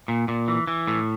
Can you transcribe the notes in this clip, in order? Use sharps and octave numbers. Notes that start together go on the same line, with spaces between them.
A#2
A#2
E3
E3
A2